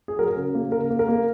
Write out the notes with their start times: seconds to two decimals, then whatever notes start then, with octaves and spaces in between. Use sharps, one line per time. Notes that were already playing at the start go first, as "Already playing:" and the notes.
0.08 G#4
0.19 F#3 A#4
0.36 C#3
0.55 A#3
0.72 C#3 A#4
0.90 A#3
0.99 A#4
1.08 A#3